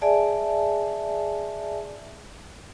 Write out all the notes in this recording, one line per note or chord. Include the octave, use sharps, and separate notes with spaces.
G#4 D5 E5 G#5 A5